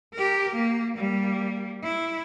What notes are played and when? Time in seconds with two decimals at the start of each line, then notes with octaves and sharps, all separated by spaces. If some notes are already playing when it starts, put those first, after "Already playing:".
0.14 G4 A#4
0.56 A#3
0.96 G3 A#3
1.83 E4